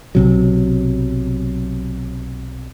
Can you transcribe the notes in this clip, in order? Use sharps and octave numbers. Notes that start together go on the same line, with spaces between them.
B1 C3 F#3